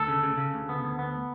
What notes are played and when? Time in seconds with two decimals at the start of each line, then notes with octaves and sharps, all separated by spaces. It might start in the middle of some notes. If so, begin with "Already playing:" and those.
Already playing: D2 A4
0.08 C#3
0.23 C#3
0.38 C#3
0.54 D2
0.69 B3
0.84 D2
0.99 B3